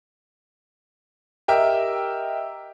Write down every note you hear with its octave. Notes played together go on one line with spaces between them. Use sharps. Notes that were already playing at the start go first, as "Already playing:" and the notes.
G4 A#4 D#5 E5 G5